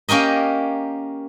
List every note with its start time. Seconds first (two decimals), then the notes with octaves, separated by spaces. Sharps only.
0.09 A#3 C#4 G4 A#4 D#5